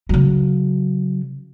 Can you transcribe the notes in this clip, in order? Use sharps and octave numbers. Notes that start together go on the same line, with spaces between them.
C#3 F#3